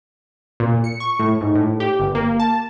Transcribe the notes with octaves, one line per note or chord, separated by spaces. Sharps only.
A#2
C#7
C#6
A2
G#2
A2
G4
G1
A#3
A5